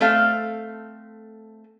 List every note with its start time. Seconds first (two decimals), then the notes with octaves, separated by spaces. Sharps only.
0.01 A3 C4 A4 F5